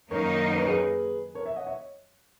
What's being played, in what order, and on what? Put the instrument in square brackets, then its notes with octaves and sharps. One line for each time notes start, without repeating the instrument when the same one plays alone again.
[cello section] F#2 D#3 A#3 D#4 [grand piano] A#4 C#5
[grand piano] B4
C#5
G#4 B4
A#4 C#5
C#5 E5
D#5 F#5
C#5 E5